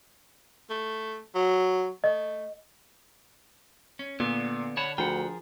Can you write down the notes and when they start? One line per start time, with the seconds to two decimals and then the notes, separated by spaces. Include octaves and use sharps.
0.70 A3
1.35 F#3
2.04 A3 D#5
3.99 C#4
4.20 A#2 D3 B3
4.77 C#5 F#5 A5 B5
4.98 D2 F3 G#4 A#4 F#5 G5